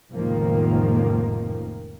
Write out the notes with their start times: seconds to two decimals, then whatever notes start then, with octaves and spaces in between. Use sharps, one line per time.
0.11 F1 C#2 A2 D#3 F3 A#3